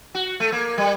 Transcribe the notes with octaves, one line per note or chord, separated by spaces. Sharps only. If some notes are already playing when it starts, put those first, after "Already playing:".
F#4
A3
A#3
G3